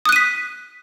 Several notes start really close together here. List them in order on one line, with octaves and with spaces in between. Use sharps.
D#6 F#6 D#7 B6